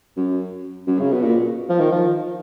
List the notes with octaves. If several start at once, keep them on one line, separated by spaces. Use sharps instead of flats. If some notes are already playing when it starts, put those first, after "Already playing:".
F#2
F#2
C#3
B2
A#2
F3
D#3
F3